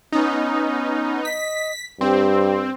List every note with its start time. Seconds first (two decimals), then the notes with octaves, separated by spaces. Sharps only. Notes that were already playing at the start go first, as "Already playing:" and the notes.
0.13 B3 C#4 D#4
1.25 D#5 B6
2.01 G2 C4 G4